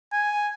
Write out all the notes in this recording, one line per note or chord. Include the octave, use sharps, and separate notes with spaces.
G#5